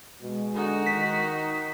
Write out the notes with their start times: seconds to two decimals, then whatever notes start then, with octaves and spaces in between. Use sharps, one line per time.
0.21 B2 G#3
0.55 D3 D#4 F#4
0.86 D#3 B6